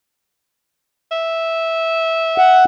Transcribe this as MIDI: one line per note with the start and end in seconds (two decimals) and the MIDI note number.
1.11 2.64 76
2.38 2.65 78